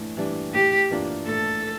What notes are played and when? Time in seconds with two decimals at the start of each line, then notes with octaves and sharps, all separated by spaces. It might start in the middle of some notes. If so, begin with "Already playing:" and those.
Already playing: A2 E3 D4
0.17 E3 G3 D4
0.53 A2 G4
0.90 E3 A#3 D4 F4
1.27 A2 A4